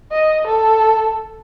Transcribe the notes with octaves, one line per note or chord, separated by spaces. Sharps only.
D#5
A4